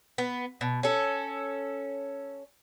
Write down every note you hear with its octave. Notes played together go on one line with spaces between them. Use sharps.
B3
B2
C#4 A4